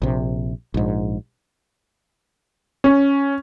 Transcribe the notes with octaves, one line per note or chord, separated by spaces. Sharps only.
A#1 C3
A#1 G#2
C#4